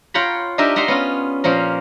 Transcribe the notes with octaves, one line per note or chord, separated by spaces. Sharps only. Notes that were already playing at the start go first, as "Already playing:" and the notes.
F4 C#5 F#5 G5 A#5 B5
D4 D#4 G4 A#4 D#5 E5
D#5 E5 F#5 A#5 C6
B3 C#4 F4
A#2 F3 C#4 A#4